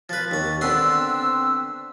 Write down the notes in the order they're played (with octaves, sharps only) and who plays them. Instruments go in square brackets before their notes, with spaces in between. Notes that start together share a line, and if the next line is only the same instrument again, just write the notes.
[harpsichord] F3 B4 [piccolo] A6
[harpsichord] D#2 C#6
[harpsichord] D3 B3 C6 [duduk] C4 [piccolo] E6